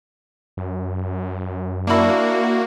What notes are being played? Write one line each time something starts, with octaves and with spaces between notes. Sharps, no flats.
F#2
A#3 D4 E4 F#4